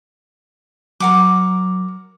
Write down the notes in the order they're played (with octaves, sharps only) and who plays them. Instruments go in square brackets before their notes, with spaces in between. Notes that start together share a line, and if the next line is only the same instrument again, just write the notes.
[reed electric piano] F#3 [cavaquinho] A#4 F#5 D6